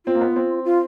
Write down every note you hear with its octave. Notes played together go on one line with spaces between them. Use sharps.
C4 F4
A#3
B3
C4
F4